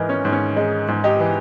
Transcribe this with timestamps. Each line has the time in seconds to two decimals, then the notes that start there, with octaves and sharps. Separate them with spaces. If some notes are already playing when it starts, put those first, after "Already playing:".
Already playing: G#2 E3 D#4 A#4
0.09 C#4
0.25 G#2
0.32 C#4
0.56 G#3 D#4
0.88 G#2
1.04 D#4 G4
1.20 E3